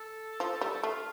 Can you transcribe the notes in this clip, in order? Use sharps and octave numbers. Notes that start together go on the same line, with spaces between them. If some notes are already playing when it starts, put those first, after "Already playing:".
Already playing: A4
F3
G3
A3 F4